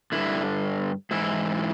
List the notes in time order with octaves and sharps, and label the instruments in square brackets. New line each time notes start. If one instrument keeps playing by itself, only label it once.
[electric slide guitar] G2 D3 E4
G#2 E3 E4